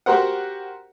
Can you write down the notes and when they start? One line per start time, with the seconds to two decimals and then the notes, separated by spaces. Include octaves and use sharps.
0.06 F#4 G4 A#4 C5 F#5